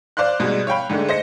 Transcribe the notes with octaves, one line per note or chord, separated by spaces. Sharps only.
C5 D5 F5 C6 F#6
G#2 B2 G3 G#3
C#5 F5 G5 B5
G#2 D3 G#3 A3
C5 D#5 A#6 C#7